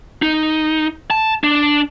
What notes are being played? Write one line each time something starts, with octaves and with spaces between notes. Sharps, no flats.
D#4
A5
D4